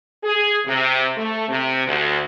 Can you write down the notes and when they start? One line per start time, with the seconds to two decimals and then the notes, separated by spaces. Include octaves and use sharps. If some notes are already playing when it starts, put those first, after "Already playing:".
0.24 G#4
0.66 C3
1.17 A3
1.49 C3
1.86 D2